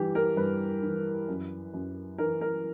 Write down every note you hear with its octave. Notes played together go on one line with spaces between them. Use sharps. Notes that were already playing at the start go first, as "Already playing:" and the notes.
Already playing: G2 E3 G4
A#4
G2 B4
E3
F#2
F#2
E3 A#4
A#4